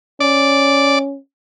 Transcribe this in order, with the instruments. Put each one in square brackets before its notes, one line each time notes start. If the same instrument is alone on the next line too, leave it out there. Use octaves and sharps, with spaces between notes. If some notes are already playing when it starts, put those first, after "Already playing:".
[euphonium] C#4 [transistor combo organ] D5